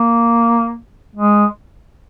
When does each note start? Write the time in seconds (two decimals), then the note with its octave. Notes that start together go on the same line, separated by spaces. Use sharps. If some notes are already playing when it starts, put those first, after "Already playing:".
Already playing: A#3
1.16 G#3